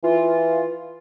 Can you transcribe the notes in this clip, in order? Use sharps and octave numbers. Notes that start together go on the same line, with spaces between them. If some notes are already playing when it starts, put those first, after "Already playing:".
E3 F4